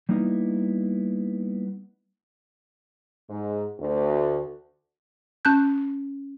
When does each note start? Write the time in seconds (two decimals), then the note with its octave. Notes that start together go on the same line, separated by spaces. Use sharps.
0.09 G3 A#3 B3 D#4 E4
3.29 G#2
3.80 D2
5.45 C#4 A5 F#6 G6